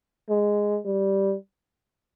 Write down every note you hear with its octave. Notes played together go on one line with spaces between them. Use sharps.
G#3
G3